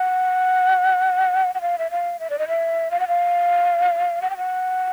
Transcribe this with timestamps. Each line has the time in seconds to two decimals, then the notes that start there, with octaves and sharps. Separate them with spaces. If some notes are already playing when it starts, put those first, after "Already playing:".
Already playing: F#5
1.55 F#5
1.61 F5
1.78 E5
1.91 F5
2.20 E5
2.30 D5
2.39 D#5
2.48 E5
2.91 F5
3.00 F#5
3.08 F5
4.22 F#5
4.30 G5
4.37 F#5